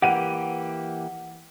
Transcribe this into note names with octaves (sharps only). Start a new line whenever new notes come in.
E3 A#3 G4 F#5 D#7